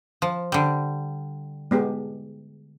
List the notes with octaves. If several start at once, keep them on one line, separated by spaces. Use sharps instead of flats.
F3
D3 G3
G#3 B3 G4